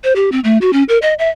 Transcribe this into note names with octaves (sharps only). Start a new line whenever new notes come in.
C5
G4
C4
A3
F#4
C#4
A#4
D#5
E5